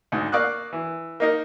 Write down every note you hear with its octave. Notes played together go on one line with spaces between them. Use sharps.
D2 G#2
A#3 D5 F5 C#6 D#6 F#6
E3
A#3 D#4 A#4